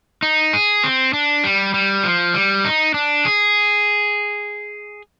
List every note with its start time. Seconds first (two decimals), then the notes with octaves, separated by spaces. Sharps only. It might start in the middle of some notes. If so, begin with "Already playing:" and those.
0.22 D#4
0.53 G#4
0.84 C4
1.13 D4
1.44 G3
1.74 G3
2.04 F3
2.34 G3
2.65 D#4
2.94 D4
3.25 G#4